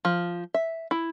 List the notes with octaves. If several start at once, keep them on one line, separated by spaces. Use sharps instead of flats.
F3
E5
E4